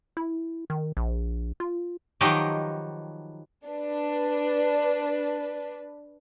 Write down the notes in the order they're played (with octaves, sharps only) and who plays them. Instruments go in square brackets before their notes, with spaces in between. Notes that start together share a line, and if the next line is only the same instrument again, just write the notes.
[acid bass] E4
D#3
A#1
F4
[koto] D#3 F3 F#3 G4 B4 D#5
[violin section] D4 B4